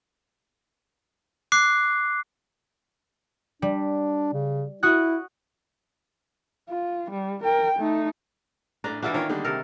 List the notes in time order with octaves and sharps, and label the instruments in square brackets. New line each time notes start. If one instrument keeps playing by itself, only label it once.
[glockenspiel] D6 F#6 C7
[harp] G3 [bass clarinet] D4
[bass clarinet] C#3
[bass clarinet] E4 [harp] F#4 D#6 F#6
[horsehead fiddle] F4
G3
A#4 G5
A3 D#4
[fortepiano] A1 A#5 [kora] D4
[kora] E3 A#3 D4 [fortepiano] F4 F#4 E5
[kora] D#3 [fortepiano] F4 A#4 C#5
[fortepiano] D3 G3 G#3 [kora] D#4
[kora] C3 A4 A#4